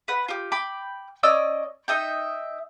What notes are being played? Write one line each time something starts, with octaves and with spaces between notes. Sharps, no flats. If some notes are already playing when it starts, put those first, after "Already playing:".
B4 F#5
F4 G4
G5 B5 D6
C#4 D5 D#5 E6
D#4 D#5 E5 G5